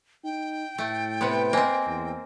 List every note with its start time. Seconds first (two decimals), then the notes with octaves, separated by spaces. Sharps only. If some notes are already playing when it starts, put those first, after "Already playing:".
0.24 D#4 G5
0.78 A2 A3
1.21 C3 B3 C5 C6
1.53 A#3 C4 C5 D#5 G#5
1.86 E2